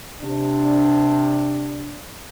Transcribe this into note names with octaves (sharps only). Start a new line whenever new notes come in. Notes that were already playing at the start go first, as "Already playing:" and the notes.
C3 D4